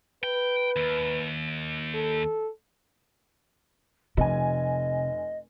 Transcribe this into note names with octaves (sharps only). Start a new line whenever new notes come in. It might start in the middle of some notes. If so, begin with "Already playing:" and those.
B4 G5
D#2
A4
F1 C3 D#5 G#5